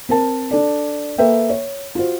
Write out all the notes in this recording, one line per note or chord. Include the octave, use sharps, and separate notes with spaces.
C4 A#4 A5
D4 A4 D5
A#3 A4 B4 E5 G5
C#5
F4 F#4 C5